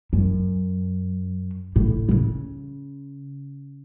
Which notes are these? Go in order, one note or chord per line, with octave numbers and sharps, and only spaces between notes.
F#2
A2
C#3